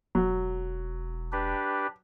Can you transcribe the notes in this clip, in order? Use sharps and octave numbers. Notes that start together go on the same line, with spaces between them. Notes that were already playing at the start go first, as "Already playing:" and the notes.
E1 F#3
D4 G4 B4